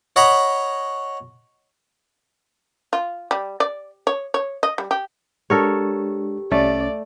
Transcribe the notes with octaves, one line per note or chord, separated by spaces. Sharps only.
C#5 D#5 F#5 A#5 B5
F4
G3
D5
C#5
C#5
D#5
G3
G4
G#3 D4 G4 A4 A#4 C#5
C2 A3 C#4 D5 A6